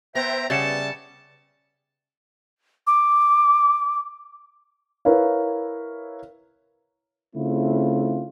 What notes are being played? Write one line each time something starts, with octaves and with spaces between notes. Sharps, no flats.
B3 C5 E5 G5 A#5
C#3 G3 B3 E5 A5 A6 C#7 E7
D6
E4 A#4 B4 C#5 F5
C#3 A3 C4 E4 F4